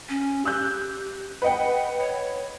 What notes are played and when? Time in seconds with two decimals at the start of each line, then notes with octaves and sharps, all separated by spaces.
0.09 C#4
0.45 G4 E6 F#6 G6
1.42 B4 D#5 F#5 G5
1.99 C#5